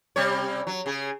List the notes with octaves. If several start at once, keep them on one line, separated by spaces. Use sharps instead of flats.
C3 G3 C#5
F#3
C#3 G#4